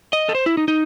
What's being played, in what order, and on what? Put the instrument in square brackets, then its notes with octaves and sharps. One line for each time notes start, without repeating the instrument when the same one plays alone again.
[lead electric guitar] D#5
A4
C5
E4
D#4
D#4